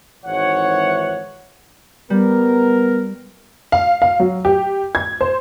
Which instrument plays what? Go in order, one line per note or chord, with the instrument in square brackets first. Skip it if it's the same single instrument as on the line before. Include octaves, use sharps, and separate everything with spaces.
[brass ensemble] G#1 E3 C#5 F#5
[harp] G3 [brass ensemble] B3 A#4
[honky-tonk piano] F5
F5
F#3
G4
G#6
C5